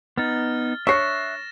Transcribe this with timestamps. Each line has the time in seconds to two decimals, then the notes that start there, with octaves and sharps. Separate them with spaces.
0.17 B3 D#4 F6 A6
0.87 D4 C#5 E5 C#6 F#6 A#6 C7 E7